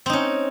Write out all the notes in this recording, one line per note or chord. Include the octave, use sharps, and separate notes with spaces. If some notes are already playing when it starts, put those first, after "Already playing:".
C4 C#4 D#4